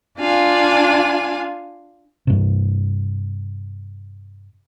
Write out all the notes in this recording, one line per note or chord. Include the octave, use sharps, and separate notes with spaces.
D4 F4 F5 G#5
G2 C3